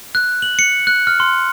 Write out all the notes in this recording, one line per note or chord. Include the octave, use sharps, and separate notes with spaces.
F#6
F#7
C#7
F#6
F6
C6